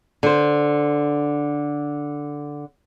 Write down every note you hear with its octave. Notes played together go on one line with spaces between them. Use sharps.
D3 C5